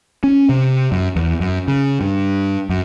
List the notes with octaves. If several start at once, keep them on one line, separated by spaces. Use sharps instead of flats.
C#4
C3
F#2
E2
F#2
C#3
G2
F#2